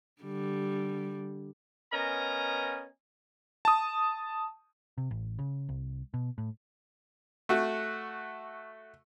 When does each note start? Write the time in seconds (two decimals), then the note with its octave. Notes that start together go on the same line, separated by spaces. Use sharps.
0.22 D3 G3
1.93 B3 C#4 A#4 D#5 G#5 A#5
3.65 A5 D#6
4.98 C3
5.11 A1
5.39 C#3
5.69 C2
6.14 B2
6.38 A2
7.49 A3 F#4